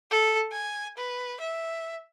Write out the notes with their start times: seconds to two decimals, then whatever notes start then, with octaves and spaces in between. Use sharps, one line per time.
0.11 A4
0.52 G#5
0.97 B4
1.40 E5